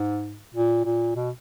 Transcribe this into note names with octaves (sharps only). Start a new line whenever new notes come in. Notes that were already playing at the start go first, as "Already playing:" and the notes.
Already playing: G#2
A#2
A#2
B2